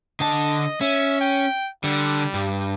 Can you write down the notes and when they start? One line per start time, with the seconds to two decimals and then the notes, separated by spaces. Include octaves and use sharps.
0.20 D3 D#5 A5
0.81 C#4 E5
1.21 G5
1.84 D3 G3
2.34 G2